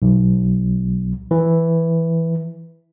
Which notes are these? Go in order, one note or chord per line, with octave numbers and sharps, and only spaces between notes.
B1
E3